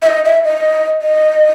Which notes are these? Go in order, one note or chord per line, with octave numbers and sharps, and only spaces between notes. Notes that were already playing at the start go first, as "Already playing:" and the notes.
E5
D#5
E5
D#5
D#5